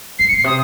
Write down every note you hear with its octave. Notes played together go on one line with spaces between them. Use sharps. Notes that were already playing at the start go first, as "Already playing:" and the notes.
F#2 C7
C#7
A#2
C7
C3 D#6